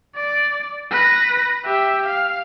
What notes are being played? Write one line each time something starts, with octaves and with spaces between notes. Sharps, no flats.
D5
B4 A#6
G4 E5
F5